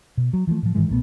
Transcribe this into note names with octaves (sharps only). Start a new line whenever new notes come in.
B2
F#3
E3 F3 G3 A3
A2 F3
G#2 D#3 E3 G#3
B1 A#2 A3 B3